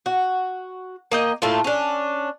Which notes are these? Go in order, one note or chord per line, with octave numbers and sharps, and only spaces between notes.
F#4
A#3 D#5 G5
A2 A3 A#3 F4
C#4 D4